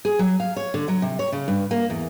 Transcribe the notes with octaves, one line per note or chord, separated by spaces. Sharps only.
G#4
F#3
F5
C#5
D3
F#3
C3
C#5
C#3
G2
A#3
E2